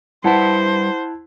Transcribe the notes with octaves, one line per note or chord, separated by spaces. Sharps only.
G3 E4 B4 C5 F#5 A5